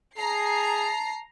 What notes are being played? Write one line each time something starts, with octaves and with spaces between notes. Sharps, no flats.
G#4 A5 A#5 C7